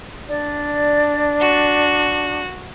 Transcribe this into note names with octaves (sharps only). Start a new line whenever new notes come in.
D4 D5
F#4